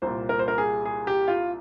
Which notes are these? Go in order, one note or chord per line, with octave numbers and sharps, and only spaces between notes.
C2 A#2 C5
A#4
C5
A#4
G#4
G#4
G4
F4